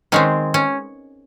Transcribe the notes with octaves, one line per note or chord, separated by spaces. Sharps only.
D#3 G#3 C4 C#4
C#4